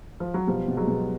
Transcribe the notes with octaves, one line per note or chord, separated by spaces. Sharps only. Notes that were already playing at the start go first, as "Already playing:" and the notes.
F3
F#3
B2 F3 G3
B2
F#3 G#3
B2